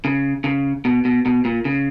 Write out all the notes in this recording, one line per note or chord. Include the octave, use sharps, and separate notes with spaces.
C#3
C#3
B2
B2
B2
A#2
C#3